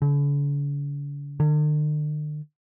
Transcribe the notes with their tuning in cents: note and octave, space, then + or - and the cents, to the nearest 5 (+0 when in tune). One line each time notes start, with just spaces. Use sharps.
D3 -45
D3 +45